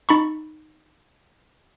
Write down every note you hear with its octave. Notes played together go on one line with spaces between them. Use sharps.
D#4 B5 C#6